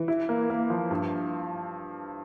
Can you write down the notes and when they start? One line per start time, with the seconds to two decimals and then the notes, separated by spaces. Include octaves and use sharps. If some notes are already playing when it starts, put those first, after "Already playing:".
Already playing: E3
0.08 E4
0.29 A#3
0.50 A#3
0.70 F3
0.91 G2